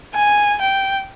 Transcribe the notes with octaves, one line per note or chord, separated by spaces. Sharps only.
G#5
G5